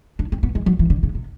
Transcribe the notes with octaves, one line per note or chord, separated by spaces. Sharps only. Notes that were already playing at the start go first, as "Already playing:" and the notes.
D4
C4
B3
G#3
F#3
E3
D3
C#3
C3